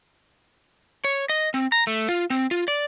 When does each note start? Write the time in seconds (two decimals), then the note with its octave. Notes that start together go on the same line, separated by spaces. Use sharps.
1.04 C#5
1.29 D#5
1.54 C4
1.72 A#5
1.87 A3
2.09 F4
2.30 C4
2.51 F4
2.68 D5